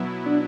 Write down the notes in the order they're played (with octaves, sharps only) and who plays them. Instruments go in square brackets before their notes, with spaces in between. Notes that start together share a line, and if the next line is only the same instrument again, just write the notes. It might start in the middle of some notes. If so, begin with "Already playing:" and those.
Already playing: [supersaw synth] B2 F#3 B3 E4
[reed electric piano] D4